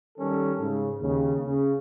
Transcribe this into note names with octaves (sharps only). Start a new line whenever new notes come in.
D#3 G3 C#4 A4
G#2 C#3
D#2 C#3
C#3